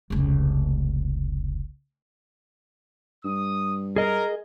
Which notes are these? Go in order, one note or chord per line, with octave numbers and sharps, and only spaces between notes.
F1 C#2
G2 D#6
G#4 A#4 D#5